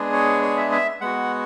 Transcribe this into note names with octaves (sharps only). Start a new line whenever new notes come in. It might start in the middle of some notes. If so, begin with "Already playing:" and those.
Already playing: G#3 B3 D4 G#4
C#5
C#5
E5
E5
G#3 B3 F#4 F#5